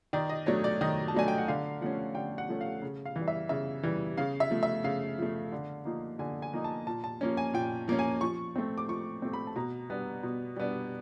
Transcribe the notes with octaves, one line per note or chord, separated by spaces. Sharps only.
D#3 D5
D#5
F#3 A3 D4 C#5
D5
D#3 D#5
A5
F#3 A3 D4 G#5
G5
F#5
D3 F5
F3 A3 C#4 F#5
D3 G5
F#5
F3 A3 C#4
F5
C#3
F5
E3
G3
E5
C#3 E5
E3 G3
C#3 F5
E5
F3 A3
E5
C#3 F5
F3 A3
D3
F3 A#3 D#4
D3 G#5
G#5
F3 A#3 D#4
A5
A#2 A5
A5
F3 A#3 C#4
G#5
A#2 G5
F3 A#3 C#4
G#5
F3 C#6
A3 C4
D6
F3 C#6
A3 C4
B5
A5
B2 A#5
G3 B3 D4
B2
G3 B3 D4